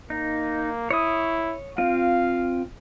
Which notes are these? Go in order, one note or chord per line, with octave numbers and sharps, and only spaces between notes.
A#3 D#4
E4 C#5 D#6
C4 F4 F5